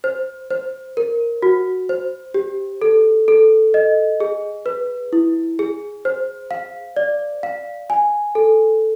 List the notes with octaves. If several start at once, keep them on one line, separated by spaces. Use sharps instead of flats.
C5
C5
A#4
F#4
C5
G4
A4
A4
D#5
G#4
B4
E4
G#4
C5
F5
D5
F5
G#5
A4